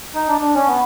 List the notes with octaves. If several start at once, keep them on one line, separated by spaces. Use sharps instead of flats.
D#4
D4
D4
C#4
B3